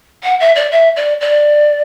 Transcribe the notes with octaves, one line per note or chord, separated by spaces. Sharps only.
F#5
E5
D5
E5
D5
D5